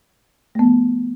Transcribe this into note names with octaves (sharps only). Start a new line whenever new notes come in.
F3 A3 B3